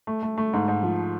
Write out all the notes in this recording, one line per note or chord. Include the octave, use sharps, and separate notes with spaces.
A3
A3
A3
G#2
G#2
F3